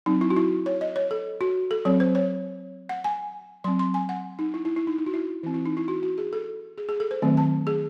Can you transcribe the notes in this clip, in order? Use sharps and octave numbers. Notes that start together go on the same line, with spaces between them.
F#3 C4 D#4
E4
F#4
E4
C#5
D#5
C#5
A4
F#4
A4
F#3 C4 C#5
C5
C#5
F#5
G#5
F#3 C4 C6
C6
G#5
F#5
D#4
E4
E4
E4
D#4
D#4
F#4
E4
E3 C4 E4
E4
D#4
E4
F#4
F#4
G#4
A4
G#4
G#4
A4
C5
D#3 F#3 A3 C4
A5
G#4